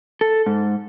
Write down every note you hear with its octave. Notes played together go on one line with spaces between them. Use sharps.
A4
G#2